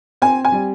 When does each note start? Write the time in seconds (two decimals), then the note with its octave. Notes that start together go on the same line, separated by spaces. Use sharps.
0.22 C4 G#5
0.45 G#5
0.52 G3